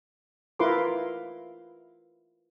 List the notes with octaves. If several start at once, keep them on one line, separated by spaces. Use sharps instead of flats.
E4 F4 A#4 B4 C6 D6